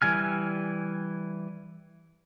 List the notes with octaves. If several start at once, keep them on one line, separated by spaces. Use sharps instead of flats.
E3 G3 G#5 F6